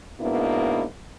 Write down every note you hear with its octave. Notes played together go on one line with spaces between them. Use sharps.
G#2 B2 A#3 B3 D4 E4